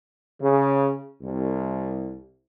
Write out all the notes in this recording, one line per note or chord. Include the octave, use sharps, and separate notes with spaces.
C#3
C2